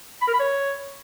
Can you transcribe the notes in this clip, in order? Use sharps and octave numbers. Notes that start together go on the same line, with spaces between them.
B5
A#4
B5
C#5